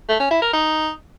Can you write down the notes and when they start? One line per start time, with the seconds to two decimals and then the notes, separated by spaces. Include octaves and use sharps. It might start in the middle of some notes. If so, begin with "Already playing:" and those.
0.09 A3
0.20 C#4
0.31 E4
0.42 A#4
0.53 D#4